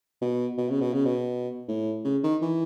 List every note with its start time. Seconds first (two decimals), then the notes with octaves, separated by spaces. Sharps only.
0.21 B2
0.58 B2
0.70 C#3
0.81 B2
0.93 C#3
1.05 B2
1.68 A2
2.04 C#3
2.24 D#3
2.42 E3